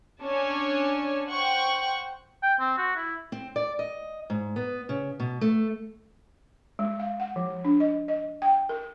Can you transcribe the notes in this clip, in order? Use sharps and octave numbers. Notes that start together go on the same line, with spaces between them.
C#4 D4 C#5 G#5 A5
C5 F#5 G5 C#6
G5
C4
F#4
E4
C4
D5
D#5
G#2
B3
C#3
B2
A3
G#3
F5
F#5
F3
D4
D#5
D#5
G5
A#4